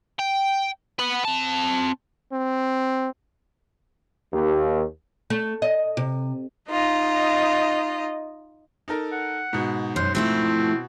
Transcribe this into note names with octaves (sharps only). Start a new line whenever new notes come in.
G5
B4 F#5
C4 A5
C4
D#2
A3
D#5
C3
D#4 F4 D#5
D#4 A4 A#4
F#5
G#2 B2
F#2 C5
F3 A3 C4 E4
B2